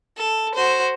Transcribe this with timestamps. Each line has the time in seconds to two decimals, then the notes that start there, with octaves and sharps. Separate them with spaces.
0.17 A4
0.55 F#4 C5